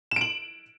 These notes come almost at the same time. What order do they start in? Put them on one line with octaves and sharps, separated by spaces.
E7 D7 F#7